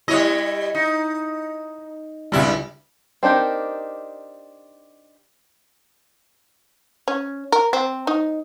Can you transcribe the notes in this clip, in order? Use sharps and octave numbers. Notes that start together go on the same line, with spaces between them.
G3 E4 C#5 D#5
D#4
C#2 G2 G3 E4
C4 D4 D#4 G4 A#4
C#4
A#4
C4
D#4